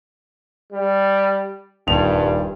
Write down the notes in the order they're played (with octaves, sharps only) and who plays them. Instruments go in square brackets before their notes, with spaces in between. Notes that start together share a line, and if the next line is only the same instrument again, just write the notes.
[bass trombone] G3
[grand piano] D#1 F7 [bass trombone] G2